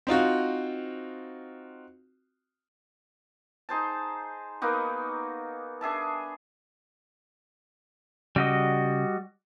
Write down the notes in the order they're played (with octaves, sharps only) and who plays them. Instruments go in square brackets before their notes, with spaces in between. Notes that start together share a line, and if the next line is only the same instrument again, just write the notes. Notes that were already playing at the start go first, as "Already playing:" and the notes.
[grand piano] C4 D#4 F4 F#4
[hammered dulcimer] D#4 G#4 C5 A5
A#3 B3 D#4 F#4
D4 G#4 E5 A5
[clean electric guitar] C#3 [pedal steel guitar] G3 F#4 D#5